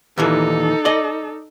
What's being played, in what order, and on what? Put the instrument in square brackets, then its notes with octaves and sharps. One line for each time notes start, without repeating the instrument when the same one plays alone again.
[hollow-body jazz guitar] D#2 A#2 E3 [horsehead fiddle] D#4 A4
[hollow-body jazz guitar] D5 D#5